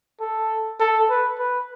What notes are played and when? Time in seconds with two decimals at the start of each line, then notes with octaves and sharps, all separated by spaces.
0.20 A4
0.80 A4
1.10 B4
1.39 B4